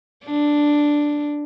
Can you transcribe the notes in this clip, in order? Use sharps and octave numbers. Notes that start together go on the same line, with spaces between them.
D4